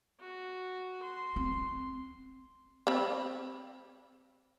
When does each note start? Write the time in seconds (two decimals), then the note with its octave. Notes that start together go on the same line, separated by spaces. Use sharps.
0.20 F#4
1.03 C6
1.36 C4
2.87 C4 B5